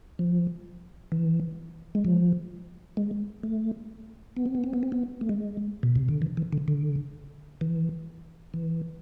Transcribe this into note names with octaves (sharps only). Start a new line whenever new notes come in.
F3
E3
G#3
F3
G#3
A3
B3
C4
B3
C4
B3
C4
B3
A3
G#3
B2
C3
D3
E3
E3
D3
D3
E3
E3